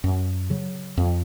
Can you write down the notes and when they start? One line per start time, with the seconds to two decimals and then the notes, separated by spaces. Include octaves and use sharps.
0.04 F#2
0.50 C#3 F#3
0.97 F2